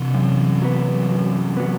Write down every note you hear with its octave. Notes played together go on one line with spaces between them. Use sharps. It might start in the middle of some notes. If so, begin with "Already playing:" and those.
Already playing: C3 E3
F#2
F#3 B3
F#2
F#3 B3